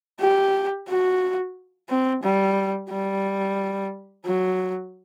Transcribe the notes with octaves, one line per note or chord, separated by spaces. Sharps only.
G4
F#4
C4
G3
G3
F#3